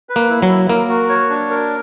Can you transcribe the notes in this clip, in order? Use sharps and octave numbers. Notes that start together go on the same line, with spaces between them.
B4
A#3
E4
F#3
E4
A#3 A#4
F#4
C#5
D4
A#4